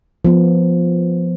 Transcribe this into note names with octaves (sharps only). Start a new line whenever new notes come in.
F3 B3